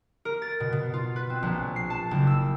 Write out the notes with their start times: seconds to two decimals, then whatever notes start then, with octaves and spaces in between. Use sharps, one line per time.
0.25 A#4
0.42 A6
0.60 B2
0.72 B2
0.94 F4
1.16 B4
1.30 C4
1.43 A#1
1.76 C7
1.90 A5
2.11 F#1
2.27 E6